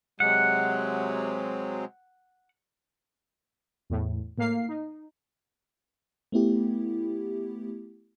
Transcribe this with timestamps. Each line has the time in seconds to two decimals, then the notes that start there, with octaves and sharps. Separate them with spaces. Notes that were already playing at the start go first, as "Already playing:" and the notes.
0.20 C3 F#3 G#3 F#5
3.90 E2 A2
4.38 A2 A#3 F5 C7
4.69 D#4
6.32 A3 B3 E4 G4